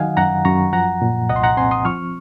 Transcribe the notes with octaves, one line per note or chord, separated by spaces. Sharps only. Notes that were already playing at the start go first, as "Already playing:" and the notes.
Already playing: D#3 F#3 D#5 F5 F#5 G#5
F#2 F#5 A#5
F#2 A#5 C#6
F3 F#5 A#5
A#2
C2 D#5 F#5
C6
F#5 A#5
C4 G#5 C6
C6 D#6
F3 C#6 F6